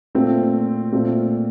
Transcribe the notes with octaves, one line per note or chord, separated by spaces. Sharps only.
A#2 A3 C4 F4
A#2 A3 C4 F4